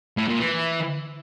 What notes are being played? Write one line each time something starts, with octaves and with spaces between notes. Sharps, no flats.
A2
A#2
E3